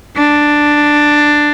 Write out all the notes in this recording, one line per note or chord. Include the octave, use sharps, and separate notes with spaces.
D4